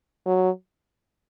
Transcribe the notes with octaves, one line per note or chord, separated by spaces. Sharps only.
F#3